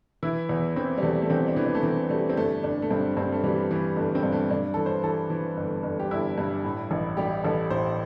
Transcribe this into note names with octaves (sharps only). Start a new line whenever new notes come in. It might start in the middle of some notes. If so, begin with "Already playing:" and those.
E3 E4
E2
E3 C4
G3
E2 A3
A3
E2 C4
D4
E3
D4
A3
E3 C4
G3 A3
C4
G1 A3
G1 D4
A3
G2 C4
G2 C4
A3
E3 G3
E3
G1 A3
C4
G2
A3
G2 D4
E3 A4
C5
E3 A4
E3
G1
G1
G4
G1 E4
G2
A2
A1
G3 G4
A1 A4
A2 C5